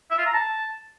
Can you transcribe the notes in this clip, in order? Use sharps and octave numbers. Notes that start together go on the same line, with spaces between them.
E5
F4
A#5
A5